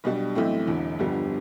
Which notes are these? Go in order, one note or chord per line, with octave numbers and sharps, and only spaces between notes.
B1 B2 G3 D4
B1 A2 E3 A3 C4
E1 E2 D3
G1 F2 D3 G3 B3